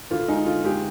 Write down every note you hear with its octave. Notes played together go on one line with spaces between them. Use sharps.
D2 F4
G#3 D#4
D3 F4
G#3 G4